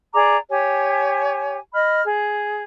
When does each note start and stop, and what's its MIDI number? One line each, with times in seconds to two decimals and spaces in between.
0.14 0.37 68
0.14 0.37 74
0.14 0.37 82
0.14 0.37 86
0.51 1.58 67
0.51 1.58 73
0.51 1.58 80
1.74 2.01 75
1.74 2.01 83
1.74 2.01 89
2.04 2.63 68